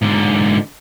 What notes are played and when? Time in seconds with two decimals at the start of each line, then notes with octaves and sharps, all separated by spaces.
0.02 G#2 D3